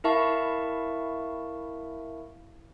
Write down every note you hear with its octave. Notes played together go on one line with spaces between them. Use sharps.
E4 A#4 E5 F5 A5 C#6